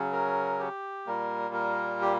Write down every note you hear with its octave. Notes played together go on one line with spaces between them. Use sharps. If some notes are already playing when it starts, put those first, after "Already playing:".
Already playing: C#3 F#3 C#4
A#4
G4
A#2 G3 A#3 A#4
A#4
G4